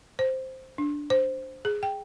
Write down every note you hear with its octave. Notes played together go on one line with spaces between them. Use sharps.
C5
D4
C5
G#4
G5